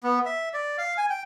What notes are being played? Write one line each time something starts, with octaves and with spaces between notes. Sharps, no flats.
B3
E5
D5
F5
G#5
G5